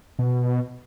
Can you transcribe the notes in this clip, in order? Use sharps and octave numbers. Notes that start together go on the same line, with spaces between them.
B2